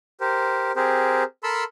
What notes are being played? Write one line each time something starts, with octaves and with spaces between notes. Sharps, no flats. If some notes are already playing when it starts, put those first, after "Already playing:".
G4 A#4 C5
C4 G4 G#4 A#4 C5
A4 A#4 A5 B5 C6 E6